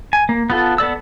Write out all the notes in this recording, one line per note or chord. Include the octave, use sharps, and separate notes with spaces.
G#5
A#3
B3 F4 A4
B3 A4 D5 E6